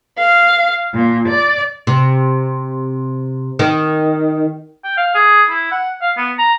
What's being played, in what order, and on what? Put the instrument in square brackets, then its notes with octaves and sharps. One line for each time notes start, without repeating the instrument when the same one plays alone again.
[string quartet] F5
A#2
D5
[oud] C3
D#3
[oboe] G5
F5
G#4
E4
F#5
F5
B3
A#5